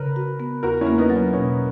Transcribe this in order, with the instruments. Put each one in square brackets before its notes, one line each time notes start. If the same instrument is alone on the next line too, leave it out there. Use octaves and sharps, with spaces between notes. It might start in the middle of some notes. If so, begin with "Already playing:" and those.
Already playing: [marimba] C#3 [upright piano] A#4 B4
[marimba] F#4
B3
[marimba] E2 [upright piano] F#4 A#4
[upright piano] C#4 E4
[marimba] A#3
[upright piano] B3 D#4
[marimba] F#3
[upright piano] C#4
[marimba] B2 [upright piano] C#4